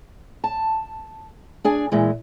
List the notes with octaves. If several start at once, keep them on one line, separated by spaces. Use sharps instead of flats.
A5
D4 G#4 G#5
A#2 E3 G#3